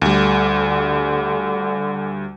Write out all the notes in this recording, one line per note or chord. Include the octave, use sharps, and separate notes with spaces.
D2 D3 G3